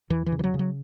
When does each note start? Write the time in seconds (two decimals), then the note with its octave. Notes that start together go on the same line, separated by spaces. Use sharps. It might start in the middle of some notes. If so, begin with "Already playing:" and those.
0.10 E2 E3
0.26 E3
0.32 C#3
0.39 E3
0.44 F#3
0.54 C#3
0.59 F#3